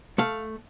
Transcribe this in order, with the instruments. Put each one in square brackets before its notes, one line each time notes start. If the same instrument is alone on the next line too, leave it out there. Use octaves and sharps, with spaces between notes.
[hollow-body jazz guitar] A3 F5